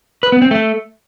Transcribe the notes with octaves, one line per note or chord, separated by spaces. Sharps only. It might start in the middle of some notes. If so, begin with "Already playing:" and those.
B4
B3
C4
A3